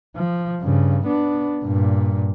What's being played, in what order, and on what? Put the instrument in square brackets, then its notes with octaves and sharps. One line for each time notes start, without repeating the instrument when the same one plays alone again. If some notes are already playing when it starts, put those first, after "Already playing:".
[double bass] F3
G2 C#3
B3 D4
G2 A#2